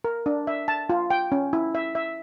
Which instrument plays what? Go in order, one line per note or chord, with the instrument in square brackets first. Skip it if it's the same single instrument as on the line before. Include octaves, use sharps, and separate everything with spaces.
[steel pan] A#4
D4
E5
A5
F4
G5
C#4
E4
E5
E5